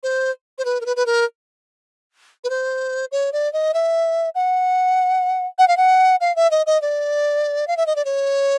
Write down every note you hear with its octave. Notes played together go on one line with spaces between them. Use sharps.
C5
C5
B4
A#4
B4
B4
A#4
B4
C5
C#5
D5
D#5
E5
F#5
F#5
F5
F#5
F5
E5
D#5
D#5
D5
F5
E5
D#5
D5
C#5